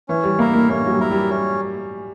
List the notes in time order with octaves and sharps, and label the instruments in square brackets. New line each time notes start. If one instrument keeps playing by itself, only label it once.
[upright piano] E3 [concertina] C#4
[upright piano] G3
[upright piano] A#3 [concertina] E4 A#4
[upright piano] A#3
[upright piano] A#3 [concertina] C#4
[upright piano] F#3
G3
[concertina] E4 A#4
[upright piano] G3
[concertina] C#4